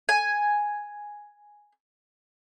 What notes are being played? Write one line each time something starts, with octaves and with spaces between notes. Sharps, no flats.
G#5